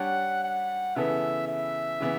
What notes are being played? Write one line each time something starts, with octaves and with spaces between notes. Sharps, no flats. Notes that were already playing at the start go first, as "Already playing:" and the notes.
Already playing: G3 D4 G4 C#5 F#5
F#5
C#3 E3 B3 E4 A4 E5
E5
C#3 E3 B3